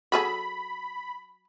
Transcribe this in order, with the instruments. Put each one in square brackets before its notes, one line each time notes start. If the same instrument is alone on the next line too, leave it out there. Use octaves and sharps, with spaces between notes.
[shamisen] F#3 G#4 A4 [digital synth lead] B5